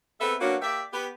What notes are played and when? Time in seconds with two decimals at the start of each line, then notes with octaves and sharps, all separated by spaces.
0.20 G#3 B3 C4 A4 E5
0.40 F#3 A#3 B3 C#4 D4 F#4
0.61 A#3 G4 D5 E5
0.93 B3 G4 B4